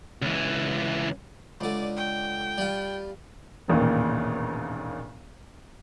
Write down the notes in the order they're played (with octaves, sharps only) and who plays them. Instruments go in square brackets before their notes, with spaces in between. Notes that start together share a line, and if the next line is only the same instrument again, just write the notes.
[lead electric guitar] C#2 E3
[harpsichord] C#2 D3 [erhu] D5
[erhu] G5
[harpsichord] G3 F4
[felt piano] E1 A1 D#2 A#2